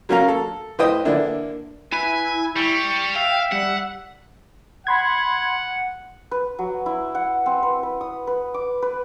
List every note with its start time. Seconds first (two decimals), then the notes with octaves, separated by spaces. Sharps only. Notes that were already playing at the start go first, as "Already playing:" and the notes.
0.09 F#3 A#3 C#4 A#4 F5 A#5
0.28 A4
0.79 A2 B4 C5 D#5 G5 D#6
1.05 D3 E3 A#3 D4 E4
1.92 E4 B4 G#5
2.56 G3 C#6
3.16 E5 F5 G5
3.52 G3 F#5
4.87 F#5 B5 C6 G#6
6.31 B4
6.59 F#3
6.86 E4
7.15 F#5
7.46 C4
7.63 B4
7.83 B4
8.01 D#6
8.27 B4
8.54 D6
8.82 B4